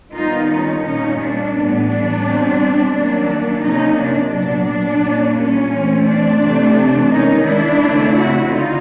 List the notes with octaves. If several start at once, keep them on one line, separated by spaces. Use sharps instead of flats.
D#3 G3 B3 D#4 F4
C#4 D#4
A#2 G3 A#3 C#4 D#4
D4
A2 E3 G3 B3
D4
B2 G3 C4
D#3 F#3 A#3 C#4 D4
C3 F3 A#3 C#4 D#4
D4
A#2 F#3 B3 D4
D4
A#2 G3 A#3 C#4
C#4
E3 A3 C4
D4
C3 E3 A3 C4
D#3 G#3 B3 C#4 D#4
D4 E4
C#3 E3 A3 C4
E4 F#4
D3 D#4 F4